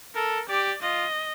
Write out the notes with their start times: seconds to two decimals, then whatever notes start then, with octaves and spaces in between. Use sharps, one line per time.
0.15 A4 A#4
0.49 G4 D5
0.82 F4 D#5